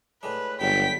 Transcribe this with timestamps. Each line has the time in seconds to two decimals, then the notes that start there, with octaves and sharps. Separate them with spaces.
0.23 A2 G#3 D4 B4
0.61 G1 D3 F#3 G#3 G5 B6